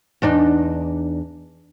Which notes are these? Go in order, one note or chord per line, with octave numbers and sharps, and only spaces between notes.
E2 D4 D#4